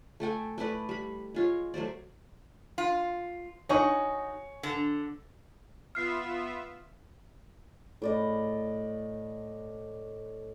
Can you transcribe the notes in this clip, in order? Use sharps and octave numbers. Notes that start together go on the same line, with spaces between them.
A3 A4 G5 G#5
A3 E4 B4 D5
G3 B5
G#3 F4 C#5
F#3 A3 C5 D5
F4
D#4 F#4 C#5 G#5 C#6
D3
B3 F4 E5 F6 C7
A2 D5 D#5